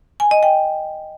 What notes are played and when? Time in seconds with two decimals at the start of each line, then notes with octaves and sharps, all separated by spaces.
0.20 G#5
0.31 D#5
0.43 G5